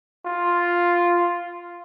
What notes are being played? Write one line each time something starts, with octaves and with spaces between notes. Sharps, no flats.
F4